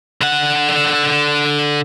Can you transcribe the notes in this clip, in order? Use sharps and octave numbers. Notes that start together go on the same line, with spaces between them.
D3 F#5